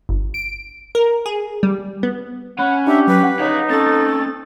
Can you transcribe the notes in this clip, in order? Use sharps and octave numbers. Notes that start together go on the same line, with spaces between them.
G1
D7
A#4
G#4
G3
B3
C#4 F#5 B5
D4 G4 E5
F#3 B4
F#5
D#4 C#5 F5
C4 C#4 A4 A6